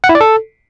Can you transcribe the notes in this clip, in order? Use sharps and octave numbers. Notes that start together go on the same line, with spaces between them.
F#5
E4
D5
A4